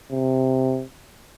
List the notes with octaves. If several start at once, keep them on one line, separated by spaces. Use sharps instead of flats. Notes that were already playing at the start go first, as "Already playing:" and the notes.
C3